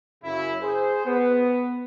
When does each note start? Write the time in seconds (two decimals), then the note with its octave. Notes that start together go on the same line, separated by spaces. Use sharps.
0.24 F#2 C#3 E4
0.61 G#4 C5
1.06 B3